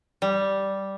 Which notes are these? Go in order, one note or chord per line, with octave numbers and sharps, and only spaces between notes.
G3